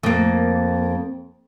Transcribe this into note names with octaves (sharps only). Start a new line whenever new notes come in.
F2 A#3